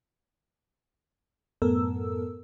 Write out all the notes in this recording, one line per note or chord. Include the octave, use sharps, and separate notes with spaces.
F#2 A2 B3 A4 A#4 E6